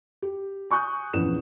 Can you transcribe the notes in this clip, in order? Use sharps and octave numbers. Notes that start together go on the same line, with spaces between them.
G4
G#5 C#6 D#6 F#6 G6
A#1 E2 C#4 B4 E7